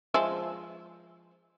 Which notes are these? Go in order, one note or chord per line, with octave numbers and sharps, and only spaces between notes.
F3 G#3 E5